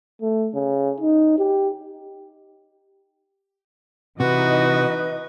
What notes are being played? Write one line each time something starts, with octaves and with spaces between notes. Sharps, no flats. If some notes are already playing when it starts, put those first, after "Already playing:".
A3
C#3
D#4
G4
C3 E3 D#4 F#4 B4 D#5